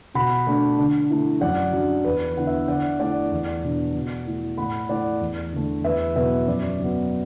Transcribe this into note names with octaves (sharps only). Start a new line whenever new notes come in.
B2 F#5 B5
A3 D4
D3
A3 E4
F#2 D5 F#5
F#3 D4
E2 B4
D3 B3 E4 F#5
B4 E5
D3 D5 F#5
A3 E4 D5 F#5
E2
B2 B3 D4
B2
A3 E4
A2 F#5 B5
A3 E4 D5 F#5
E2
D3 A3
E2 B4 E5
B2 F#3 B3 B4 E5
F#2 D5
F#3 B3